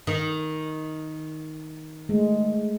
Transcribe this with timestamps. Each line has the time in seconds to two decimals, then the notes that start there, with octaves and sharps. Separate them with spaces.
0.07 D#3
2.09 G#3 A3